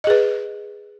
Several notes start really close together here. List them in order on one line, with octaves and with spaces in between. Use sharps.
D#5 G#4 B4